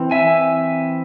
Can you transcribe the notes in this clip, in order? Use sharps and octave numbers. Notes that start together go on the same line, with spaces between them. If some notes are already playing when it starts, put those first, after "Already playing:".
Already playing: E3 C4
E5 G#5